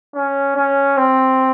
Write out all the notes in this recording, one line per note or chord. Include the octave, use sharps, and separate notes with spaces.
C#4
C#4
C4